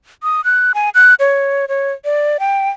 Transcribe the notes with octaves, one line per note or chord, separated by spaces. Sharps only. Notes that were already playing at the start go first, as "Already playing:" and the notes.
D#6
F#6
G#5
F#6
C#5
C#5
D5
G5